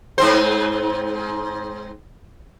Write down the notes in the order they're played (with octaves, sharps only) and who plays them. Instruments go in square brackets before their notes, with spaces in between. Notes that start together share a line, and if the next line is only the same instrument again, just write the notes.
[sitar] G#2 C4 C5